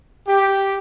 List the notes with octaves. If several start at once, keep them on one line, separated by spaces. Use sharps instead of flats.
G4